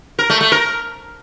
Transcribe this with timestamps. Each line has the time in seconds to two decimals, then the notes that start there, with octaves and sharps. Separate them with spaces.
0.19 A#4
0.30 A3
0.41 A3
0.52 A#4